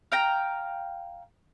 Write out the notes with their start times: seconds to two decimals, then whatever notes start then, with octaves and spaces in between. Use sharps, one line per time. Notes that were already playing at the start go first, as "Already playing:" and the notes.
0.12 F5 G5 A#5